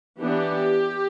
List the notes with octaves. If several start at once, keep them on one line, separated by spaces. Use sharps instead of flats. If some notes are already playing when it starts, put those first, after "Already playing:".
E3 B3 D4 G4